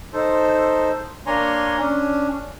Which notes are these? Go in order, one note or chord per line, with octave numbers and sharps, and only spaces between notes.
D#4 A4 C5
A#3 D4 C#5 G#5 A#5 C6
C#4 D4